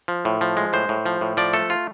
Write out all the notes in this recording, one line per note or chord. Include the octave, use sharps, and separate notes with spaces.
F3
A2
F3
G#3
A2 C5
A2
F3
A2
F3 D5
A3 A4
F4